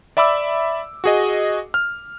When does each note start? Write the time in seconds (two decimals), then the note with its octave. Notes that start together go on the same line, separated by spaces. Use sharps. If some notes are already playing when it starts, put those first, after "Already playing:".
0.17 D5 E5 B5 D6 E6
1.04 F#4 G#4 D#5
1.74 F6